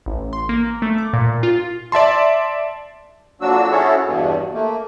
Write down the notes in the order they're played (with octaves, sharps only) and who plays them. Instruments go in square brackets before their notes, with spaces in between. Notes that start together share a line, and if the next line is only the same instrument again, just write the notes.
[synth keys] A1
C6
A#3
A3
D6
A#2
F4
[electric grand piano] D5 E5 A5 C6
[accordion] F2 F#3 A#3 D4 F#4 E6
C#4 E4 F#4 G#4 A4 C#5
E2 G2 B2
A3 A#3